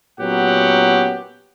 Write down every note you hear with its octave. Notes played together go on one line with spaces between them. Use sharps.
A#2 F#3 B3 C#4 G4 F#5